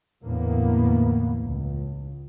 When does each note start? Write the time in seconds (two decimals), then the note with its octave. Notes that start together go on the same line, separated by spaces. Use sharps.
0.23 E2 A2 D3 A#3 B3
1.40 C#2